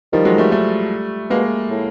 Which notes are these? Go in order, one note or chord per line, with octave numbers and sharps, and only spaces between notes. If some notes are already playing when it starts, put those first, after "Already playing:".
D#3 F3 G3
F#3 G#3
G3 A3
G3 A3
B2 G#3 A#3
A2